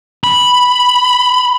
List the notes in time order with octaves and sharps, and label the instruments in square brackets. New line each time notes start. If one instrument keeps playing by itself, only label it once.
[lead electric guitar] B5